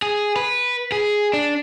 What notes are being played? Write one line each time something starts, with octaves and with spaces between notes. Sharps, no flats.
G#4
B4
G#4
D4